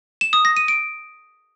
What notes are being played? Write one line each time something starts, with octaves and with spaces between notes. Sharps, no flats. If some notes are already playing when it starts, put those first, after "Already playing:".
E7
D#6
A#6
D#7
D7